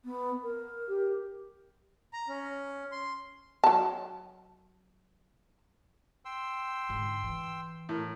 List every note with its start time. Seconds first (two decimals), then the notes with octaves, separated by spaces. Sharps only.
0.05 B3
0.43 A#4
0.88 G4
2.13 A#5
2.28 C#4
2.92 C6
3.64 F#3 A5
6.25 G5 C6 E6
6.89 G#2 D3
7.23 E3
7.89 A2 A#4